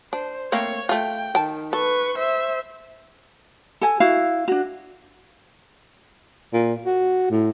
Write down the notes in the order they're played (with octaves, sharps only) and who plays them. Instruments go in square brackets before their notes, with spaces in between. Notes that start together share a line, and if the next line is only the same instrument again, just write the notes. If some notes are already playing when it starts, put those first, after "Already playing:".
[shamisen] D4 [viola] C5
[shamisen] A3 A#3 C4 [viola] C#5
[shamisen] A3 F4 [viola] G5
[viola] D#3 [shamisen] G5 A5
[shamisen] A4 [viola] B4 C#6
[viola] C5 E5
[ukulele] A4 G#5
E4 F#4 F5
D4 F#4
[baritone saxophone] A#2
F#4
A2